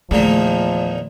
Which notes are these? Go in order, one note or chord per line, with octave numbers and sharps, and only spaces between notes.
E2 A#2 D#3 F3 A3